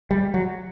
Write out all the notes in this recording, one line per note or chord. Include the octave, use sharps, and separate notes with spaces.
G3
F#3